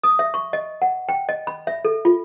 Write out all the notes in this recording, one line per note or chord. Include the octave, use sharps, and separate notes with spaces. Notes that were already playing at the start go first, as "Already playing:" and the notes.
D#6
E5
C#6
D#5
F#5
G5
D#5
B5
E5
A4
F4